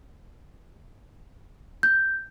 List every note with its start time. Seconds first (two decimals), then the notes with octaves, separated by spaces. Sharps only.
1.83 G6